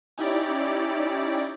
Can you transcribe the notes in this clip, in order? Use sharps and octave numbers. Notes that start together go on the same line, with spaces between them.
C#4 D#4 E4 G4 D5